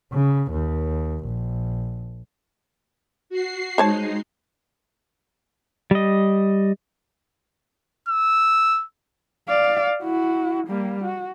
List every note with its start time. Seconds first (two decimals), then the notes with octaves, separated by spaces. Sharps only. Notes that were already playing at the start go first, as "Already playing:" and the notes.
0.12 C#3
0.51 D#2
1.25 A#1
3.30 F#4 C7
3.78 G#3 D#4 C5 C#5 A5
5.91 G3 D#5
8.09 E6
9.48 D5 F5
10.02 E4 F#4
10.67 G3 A#3
11.04 F#4